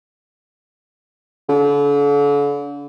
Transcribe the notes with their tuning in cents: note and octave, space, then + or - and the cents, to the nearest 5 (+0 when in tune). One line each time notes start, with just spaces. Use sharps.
D3 -40